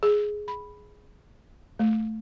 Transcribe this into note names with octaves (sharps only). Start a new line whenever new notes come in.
G#4
B5
A3